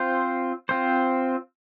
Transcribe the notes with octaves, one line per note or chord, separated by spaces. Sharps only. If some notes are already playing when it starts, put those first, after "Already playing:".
Already playing: C4 F4 C5
C4 F4 C5